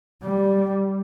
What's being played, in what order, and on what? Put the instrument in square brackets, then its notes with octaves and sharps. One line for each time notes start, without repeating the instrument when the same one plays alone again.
[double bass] G3